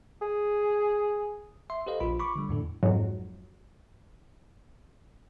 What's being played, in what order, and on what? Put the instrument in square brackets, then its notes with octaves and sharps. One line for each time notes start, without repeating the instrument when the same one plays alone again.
[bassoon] G#4
[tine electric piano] E5 C6
G4 A4 B4 C5 D#5 F5
A#1 F4 B5
B5 C#6 D6
D3 G3
E2 A2 D3
[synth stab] F2 G#2 F#3